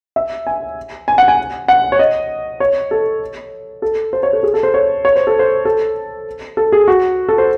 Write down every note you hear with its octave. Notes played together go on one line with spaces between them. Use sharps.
E5
G#5
G#5
F#5
G#5
F#5
C#5
D#5
C#5
A4
A4
C5
C#5
A4
G#4
A4
C5
C#5
C#5
C5
A4
C5
A4
A4
G#4
F#4
A4
C5